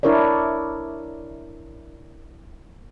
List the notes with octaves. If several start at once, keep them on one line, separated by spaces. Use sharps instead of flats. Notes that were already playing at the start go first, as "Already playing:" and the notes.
D4 E4 A#4 C#5 D5